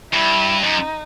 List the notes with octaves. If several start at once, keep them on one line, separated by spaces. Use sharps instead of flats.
G2 E4
F#2 D#4